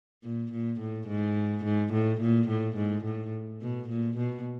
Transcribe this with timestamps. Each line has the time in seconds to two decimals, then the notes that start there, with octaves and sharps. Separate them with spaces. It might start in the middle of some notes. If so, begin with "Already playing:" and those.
0.23 A#2
0.52 A#2
0.80 A2
1.08 G#2
1.64 G#2
1.93 A2
2.21 A#2
2.48 A2
2.77 G#2
3.05 A2
3.61 B2
3.89 A#2
4.17 B2